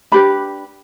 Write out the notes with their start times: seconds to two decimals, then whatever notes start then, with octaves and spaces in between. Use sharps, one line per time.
0.12 D4 G4 B4 B5